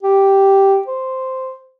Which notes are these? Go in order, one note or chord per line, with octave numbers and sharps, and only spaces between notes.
G4
C5